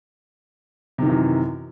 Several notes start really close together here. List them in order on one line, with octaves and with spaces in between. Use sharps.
C3 D#3 E3 F#2